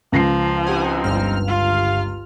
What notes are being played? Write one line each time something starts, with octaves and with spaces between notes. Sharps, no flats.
C#2 F3 A#6 C7
C4 D#4 G4 F#5 G#5
G1 G2 F6
F4 F5